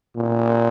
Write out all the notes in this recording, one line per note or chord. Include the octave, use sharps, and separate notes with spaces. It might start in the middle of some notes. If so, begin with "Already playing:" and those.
A#2